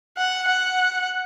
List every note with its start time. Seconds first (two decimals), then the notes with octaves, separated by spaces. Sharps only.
0.17 F#5
0.49 F#5